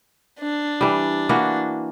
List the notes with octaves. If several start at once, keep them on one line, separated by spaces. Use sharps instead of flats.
D4
E3 G3
E3 A#3 F#4